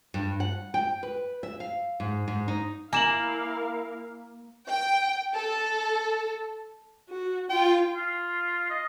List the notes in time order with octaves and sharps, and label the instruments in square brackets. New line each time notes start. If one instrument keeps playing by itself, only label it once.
[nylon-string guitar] G2
F#5
G5
B4
E5
F5
G#2
G#2
D#4
[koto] A#3 [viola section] E4 A#4 F5 [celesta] G#5 E7 F#7
[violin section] G5
A4
[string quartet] F#4
[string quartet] F4 [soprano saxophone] G5
[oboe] F4
D#5